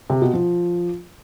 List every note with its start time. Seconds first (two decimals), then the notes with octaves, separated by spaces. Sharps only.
0.10 C3
0.22 B2
0.34 F3